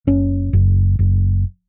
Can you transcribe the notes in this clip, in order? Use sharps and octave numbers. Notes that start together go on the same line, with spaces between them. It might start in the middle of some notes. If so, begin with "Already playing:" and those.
F#1 C#4
F#1
F#1